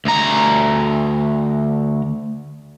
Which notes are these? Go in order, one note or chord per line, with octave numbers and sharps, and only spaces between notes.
D2 A#5